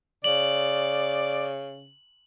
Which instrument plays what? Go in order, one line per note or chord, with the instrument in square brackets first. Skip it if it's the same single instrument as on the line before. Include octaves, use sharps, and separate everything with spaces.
[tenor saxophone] C#3 [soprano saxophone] D5 [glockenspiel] F#7